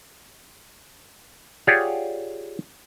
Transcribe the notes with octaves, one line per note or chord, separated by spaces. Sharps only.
F4 G4 G#4 C#5 D5 F#5